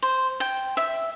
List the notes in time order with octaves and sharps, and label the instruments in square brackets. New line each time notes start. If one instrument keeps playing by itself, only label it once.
[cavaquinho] C5
G5
E5